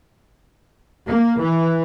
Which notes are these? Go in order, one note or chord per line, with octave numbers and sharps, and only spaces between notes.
A#3
E3